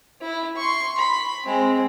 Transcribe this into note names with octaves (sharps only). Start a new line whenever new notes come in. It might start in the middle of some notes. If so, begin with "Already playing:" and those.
E4
C6 C#6
B5
G#3 C4